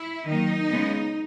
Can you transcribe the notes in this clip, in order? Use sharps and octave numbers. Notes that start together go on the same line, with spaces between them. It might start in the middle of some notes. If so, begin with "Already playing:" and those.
Already playing: E4
D#3 F#3 A#3 D#4
C#3 G#3 B3